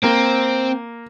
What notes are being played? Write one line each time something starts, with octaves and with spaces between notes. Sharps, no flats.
A#3 C4